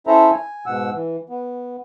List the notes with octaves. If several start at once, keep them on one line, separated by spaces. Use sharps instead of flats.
C#4 E4 A4 C5 E5 A#5
G#5
G#2 B2 F#5 E6
E3
B3